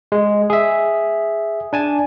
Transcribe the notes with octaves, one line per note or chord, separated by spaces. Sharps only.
G#3
G#4 E5
D4 G#5 A5